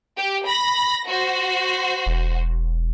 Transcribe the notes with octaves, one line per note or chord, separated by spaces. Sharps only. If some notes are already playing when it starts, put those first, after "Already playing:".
G4
B5 A#6
F#4 C5
E1